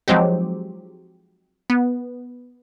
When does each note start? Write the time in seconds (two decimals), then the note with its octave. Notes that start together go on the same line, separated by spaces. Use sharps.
0.08 F3 F#3 G#3 C4 D#4 G4
1.70 B3